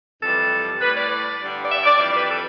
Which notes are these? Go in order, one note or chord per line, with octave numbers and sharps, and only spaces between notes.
F2 C3 E3 G3 A4
A2 G3 B4
D5
G2 D3 G3
D5
E5
D5
F2 E3 G3 D5
B4
A4